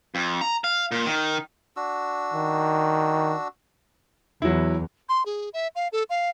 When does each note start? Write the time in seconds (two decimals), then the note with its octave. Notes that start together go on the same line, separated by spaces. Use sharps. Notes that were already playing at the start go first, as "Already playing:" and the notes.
0.15 F2
0.41 A#5
0.64 F5
0.92 A#2
1.06 D#3
1.76 D4 F#4 E6
2.34 D#3
4.42 E2 F#3 E4
5.09 C6
5.26 G#4
5.54 E5
5.75 F5
5.92 A4
6.10 F5